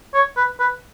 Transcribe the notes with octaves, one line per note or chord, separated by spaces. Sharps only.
C#5
B4
B4